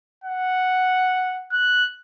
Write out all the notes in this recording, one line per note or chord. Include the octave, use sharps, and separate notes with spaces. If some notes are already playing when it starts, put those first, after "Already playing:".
F#5
F#6